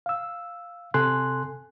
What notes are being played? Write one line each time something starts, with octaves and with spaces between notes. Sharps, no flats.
F5 E6
C3 A4 G#5 C6 F#6